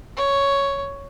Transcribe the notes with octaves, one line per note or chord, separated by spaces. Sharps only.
C#5